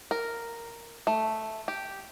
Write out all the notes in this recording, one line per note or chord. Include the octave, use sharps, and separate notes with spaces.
A#4
A3
G4